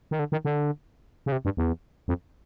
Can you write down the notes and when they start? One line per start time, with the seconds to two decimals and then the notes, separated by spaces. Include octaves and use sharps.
0.11 D#3
0.19 D3
0.32 D#3
0.45 D3
1.26 C#3
1.32 C3
1.45 G2
1.57 E2
2.08 F2